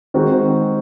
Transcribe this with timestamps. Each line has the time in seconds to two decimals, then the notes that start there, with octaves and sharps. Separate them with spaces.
0.14 D#3 G#3 C4 F#4